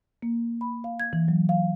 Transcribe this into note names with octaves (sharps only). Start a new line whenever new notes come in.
A#3
B5
F5
G#6
E3
F#3
F5